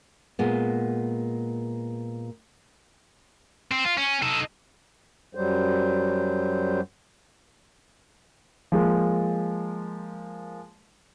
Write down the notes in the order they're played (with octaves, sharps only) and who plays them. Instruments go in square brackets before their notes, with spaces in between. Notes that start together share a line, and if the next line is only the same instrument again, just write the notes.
[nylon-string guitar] A#2 G#3 B3
[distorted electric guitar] C4
F4
C#4
D#4 A4
[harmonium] F#2 F#3 G3 C5
[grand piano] F3 G#3 A#3